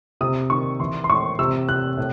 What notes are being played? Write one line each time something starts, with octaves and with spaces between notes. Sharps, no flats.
C3 D#6
D#3 C#6
E3 C6
C6
A2 C#6
C3 E6
C3 F#6
A2